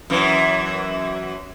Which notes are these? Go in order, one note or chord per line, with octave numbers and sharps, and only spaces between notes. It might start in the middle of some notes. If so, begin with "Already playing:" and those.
F#2 E3